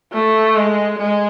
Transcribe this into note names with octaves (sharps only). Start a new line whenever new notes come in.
A3
G#3
G#3